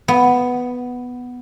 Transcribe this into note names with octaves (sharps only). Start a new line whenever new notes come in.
B3